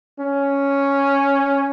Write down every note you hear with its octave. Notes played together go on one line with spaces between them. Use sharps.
C#4